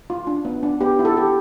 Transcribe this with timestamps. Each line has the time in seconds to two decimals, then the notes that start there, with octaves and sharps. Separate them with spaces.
0.10 F4
0.27 D4
0.45 B3
0.63 D4
0.81 B3 G4
0.99 E4
1.05 A4
1.17 G4